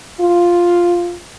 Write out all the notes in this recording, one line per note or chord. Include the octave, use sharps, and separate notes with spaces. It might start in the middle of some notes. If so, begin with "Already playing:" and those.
F4